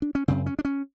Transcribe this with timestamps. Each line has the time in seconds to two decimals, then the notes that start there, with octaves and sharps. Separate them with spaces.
0.02 D4
0.15 C#4
0.28 F#2 C#3 C4
0.46 C#4
0.59 D4
0.65 C#4